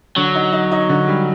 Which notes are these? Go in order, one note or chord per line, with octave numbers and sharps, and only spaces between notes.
D3 F#3
D#4
D#4
D#4
D3
G3